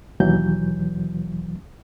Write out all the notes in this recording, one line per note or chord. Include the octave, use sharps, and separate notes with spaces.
D#2 B2 E3 F#3 G6